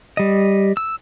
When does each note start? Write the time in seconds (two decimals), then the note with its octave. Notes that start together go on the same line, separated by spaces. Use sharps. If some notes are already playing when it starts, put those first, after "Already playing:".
0.17 G3 D#5
0.77 E6